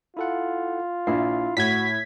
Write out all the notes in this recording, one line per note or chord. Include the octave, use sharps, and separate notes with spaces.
E4 F4 A4 F#5
A#1 E4 C7
A2 F#4 G#6 B6